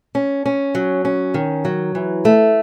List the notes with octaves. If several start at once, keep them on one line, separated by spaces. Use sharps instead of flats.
C#4
C#4
F#3
C#4
D#3
F#3
E3
A3